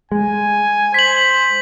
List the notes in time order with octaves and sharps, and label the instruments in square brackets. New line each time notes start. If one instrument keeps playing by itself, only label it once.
[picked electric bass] G#3 [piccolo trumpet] G#5
[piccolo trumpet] C5 [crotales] B6 F#7